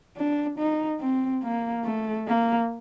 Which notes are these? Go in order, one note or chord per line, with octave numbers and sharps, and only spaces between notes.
D4
D#4
C4
A#3
A3
A#3